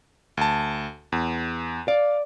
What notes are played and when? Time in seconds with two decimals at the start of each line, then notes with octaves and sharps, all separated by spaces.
0.37 D2 A5
1.12 E2
1.88 D5 F5